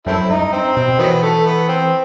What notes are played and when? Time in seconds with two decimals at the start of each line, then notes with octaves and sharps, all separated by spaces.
0.07 F#2 A3 C4 E4
0.30 G2 D#4
0.53 C4
0.76 B2 C4
0.99 D#3 E3 F#3 B3
1.23 A3
1.45 B3
1.69 C4